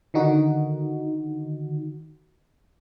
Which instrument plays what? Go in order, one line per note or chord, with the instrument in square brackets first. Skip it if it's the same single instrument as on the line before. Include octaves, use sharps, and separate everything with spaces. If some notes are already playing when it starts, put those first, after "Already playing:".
[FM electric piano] D3 D#3 D#4 F#4